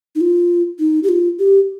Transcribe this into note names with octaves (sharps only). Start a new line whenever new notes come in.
D#4
F4
D#4
G4
F4
G4